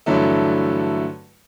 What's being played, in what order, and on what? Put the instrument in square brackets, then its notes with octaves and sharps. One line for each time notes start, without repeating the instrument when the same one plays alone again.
[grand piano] G2 D3 E3 F#3 A3